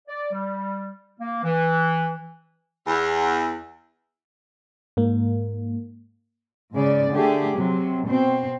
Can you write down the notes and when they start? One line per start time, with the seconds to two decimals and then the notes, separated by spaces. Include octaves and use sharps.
0.08 D5
0.32 G3
1.20 A#3
1.44 E3
2.86 E2
4.97 G#2 A#3
6.73 G#2 C#3 D5
7.11 D3 A3 G4 G#4
7.56 C3 F#3
8.07 B2 C4